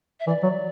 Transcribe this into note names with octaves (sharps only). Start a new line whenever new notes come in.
E5
E3 D5
F#3